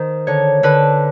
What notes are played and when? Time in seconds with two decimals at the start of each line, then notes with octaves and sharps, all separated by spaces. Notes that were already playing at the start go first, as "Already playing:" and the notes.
Already playing: D#3 C5
0.27 D3 C#5
0.63 D3 B4